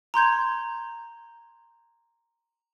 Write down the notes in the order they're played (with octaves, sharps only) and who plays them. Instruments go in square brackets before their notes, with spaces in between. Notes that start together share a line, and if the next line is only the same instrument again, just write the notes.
[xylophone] A#5 C6 G6 G#6